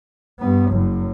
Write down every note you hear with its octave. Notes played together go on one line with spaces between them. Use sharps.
G2 B3
F#1 F#2